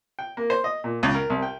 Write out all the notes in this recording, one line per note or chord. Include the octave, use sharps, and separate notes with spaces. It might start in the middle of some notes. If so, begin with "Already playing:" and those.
G5
A#3
C5
D#5
A#2
C#2
A#4
C2
G5